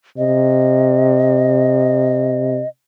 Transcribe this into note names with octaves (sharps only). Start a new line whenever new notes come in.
C3 D#5